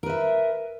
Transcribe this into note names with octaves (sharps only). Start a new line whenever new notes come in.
A#4 B4 E5